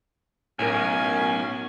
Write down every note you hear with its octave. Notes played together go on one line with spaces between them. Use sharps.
B1 A2 C#4 A#4 G#5